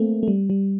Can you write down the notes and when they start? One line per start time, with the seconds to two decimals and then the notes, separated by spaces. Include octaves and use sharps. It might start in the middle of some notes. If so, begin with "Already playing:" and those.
Already playing: A3 A#3 C4
0.23 A3
0.28 G3
0.50 G3